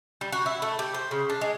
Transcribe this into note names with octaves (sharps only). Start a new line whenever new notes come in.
G3
F#4
E4
A3
G4
C5
C#3
D4
G#3